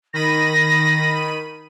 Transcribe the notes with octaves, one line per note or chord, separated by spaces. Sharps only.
D#3 B5 A#6 D#7